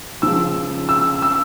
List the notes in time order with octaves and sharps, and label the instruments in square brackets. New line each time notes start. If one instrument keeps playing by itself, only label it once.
[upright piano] C#2 C#3 F3 E6
E6
E6